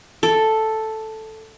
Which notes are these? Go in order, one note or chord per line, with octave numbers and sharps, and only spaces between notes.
A4